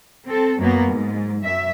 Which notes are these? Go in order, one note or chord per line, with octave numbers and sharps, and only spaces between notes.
C4 A4
F#2 F#3 A#3 B3
G#2
F#2 E5